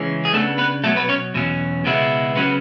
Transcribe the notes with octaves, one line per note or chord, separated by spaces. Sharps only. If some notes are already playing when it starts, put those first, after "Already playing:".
Already playing: C#3 E3 G#3 C#4
G#4
C#3 F#3 A3 B3 D4 A4
B3 B4
B2 F#3 A3 B3 A4
B3 B4
C#4 C#5
E2 B2 F#3 C#4
C#2 B2 G#3 B3 E4
C#3 F#3 B3 C#4 B4